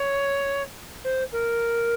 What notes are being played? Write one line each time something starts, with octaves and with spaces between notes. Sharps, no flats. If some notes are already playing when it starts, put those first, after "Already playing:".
Already playing: C#5
C5
A#4